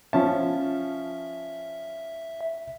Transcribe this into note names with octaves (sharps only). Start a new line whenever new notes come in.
F3 C#4 E5 A5